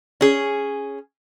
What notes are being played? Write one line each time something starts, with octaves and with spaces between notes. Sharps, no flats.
C#4 G#4